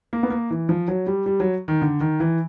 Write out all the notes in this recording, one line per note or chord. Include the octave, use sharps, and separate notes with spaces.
A#3
B3
A#3
E3
F3
F#3
G3
G3
F#3
D#3
D3
D#3
E3